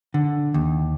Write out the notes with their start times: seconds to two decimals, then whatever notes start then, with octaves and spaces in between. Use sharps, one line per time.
0.14 D3
0.54 D#2